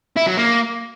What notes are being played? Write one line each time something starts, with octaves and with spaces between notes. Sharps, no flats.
E4
F#3
A#3